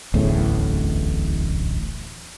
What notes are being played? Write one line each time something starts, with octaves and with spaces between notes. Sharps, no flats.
D1 A1 E2 A2